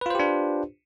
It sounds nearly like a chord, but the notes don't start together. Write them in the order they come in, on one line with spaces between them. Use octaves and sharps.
B4 F4 C5 G4 D4